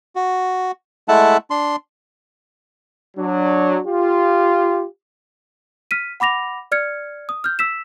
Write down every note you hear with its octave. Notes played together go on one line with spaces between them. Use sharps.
F#4
G#3 A3 E4 E5 F#5 A5
D4 C6
F#3 D4
F4 G4
F6 B6 D#7
F#5 B5 D6 A#6 F7
D5 F6 G#6 C#7
D#6
F6 G6
E6 B6 E7